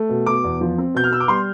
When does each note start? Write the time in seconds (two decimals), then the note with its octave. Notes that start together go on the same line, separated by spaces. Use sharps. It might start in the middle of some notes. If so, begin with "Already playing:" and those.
Already playing: A3
0.09 B2
0.26 B2 D6
0.44 E2
0.61 F3
0.78 C4
0.94 B2 G6
1.04 F6
1.11 B3 E6
1.20 D6
1.28 G3 C6